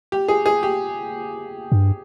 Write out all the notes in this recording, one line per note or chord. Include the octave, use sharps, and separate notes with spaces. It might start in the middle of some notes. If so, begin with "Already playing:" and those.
G4
G#4
G#4
G4
G2